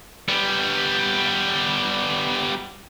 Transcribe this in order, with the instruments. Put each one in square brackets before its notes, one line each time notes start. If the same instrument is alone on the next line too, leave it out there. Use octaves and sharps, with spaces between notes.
[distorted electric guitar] G3 B3